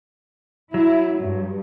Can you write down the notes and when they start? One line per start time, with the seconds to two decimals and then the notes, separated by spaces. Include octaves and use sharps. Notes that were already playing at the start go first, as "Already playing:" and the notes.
0.74 F#3 E4
1.21 G2